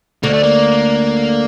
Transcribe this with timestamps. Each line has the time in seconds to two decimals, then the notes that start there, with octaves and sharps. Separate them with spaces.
0.23 D2 D3 A#3
0.33 A3
0.43 A#3